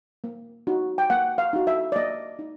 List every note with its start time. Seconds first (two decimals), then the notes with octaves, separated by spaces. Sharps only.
0.24 A#3
0.67 D#4 F#4
0.98 G5
1.10 A#3 F#5
1.38 F5
1.53 D#4 F#4
1.67 E5
1.92 D5
1.96 A#3 D#5
2.39 D#4